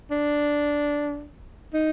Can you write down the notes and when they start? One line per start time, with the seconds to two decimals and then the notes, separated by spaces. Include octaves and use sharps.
0.10 D4
1.73 D#4